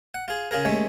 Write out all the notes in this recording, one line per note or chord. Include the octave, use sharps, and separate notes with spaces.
F#5
F4 G#4
C#3 F4 G#4 A#4
D#2 G#3 A3 C#4